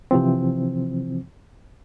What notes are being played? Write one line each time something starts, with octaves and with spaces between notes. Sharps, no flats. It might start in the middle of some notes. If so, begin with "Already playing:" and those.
C3 E3 F3 C4